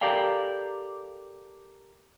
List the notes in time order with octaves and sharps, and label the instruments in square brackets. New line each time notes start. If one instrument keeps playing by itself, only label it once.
[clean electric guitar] G4 A4 A#4 D5 F5 G5